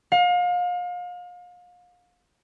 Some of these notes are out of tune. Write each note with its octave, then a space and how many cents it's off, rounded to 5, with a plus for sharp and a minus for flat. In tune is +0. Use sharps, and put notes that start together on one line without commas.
F5 +35